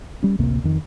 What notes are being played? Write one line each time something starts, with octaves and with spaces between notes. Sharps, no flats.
G3 C#4
A1 D2 C3 A#3
F2 D#3